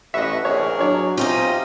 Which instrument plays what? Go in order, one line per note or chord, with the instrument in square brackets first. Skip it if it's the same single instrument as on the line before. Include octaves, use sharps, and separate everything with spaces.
[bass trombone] A1 [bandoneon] B4 F#5 C#6 [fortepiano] D#5 E5
[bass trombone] A#1 [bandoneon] G#4 A#4 [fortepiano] C#5
[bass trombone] F#3 [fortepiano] D4 C#5
[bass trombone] C3 [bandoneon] C#4 D#4 [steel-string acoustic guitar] F4 G4 D#5